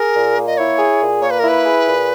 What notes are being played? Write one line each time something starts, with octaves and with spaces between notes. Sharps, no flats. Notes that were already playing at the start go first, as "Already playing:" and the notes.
Already playing: G#4 A#4
A#2
A#3
D#5
E4 C#5
G#4
A#2
A#3 C#5
B4
E4 A#4
B4
G#4
A#2